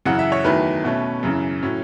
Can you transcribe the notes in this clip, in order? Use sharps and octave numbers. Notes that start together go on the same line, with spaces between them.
F#2 C#3 E3 F#5
E5
C#5
E2 D#3 F#3 A3 B4
B2 A3 C#4
F#2 C#3 E3
A2 F#3 C#4